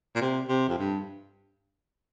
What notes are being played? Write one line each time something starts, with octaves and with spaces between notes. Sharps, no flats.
A#2
C3
C3
F2
G2